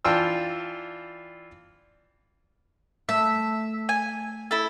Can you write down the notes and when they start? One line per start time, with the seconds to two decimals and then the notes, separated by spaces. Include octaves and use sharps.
0.05 E3 D4 F4 G5 A5 E6
3.09 A3 E5
3.89 G#5
4.51 E4 A4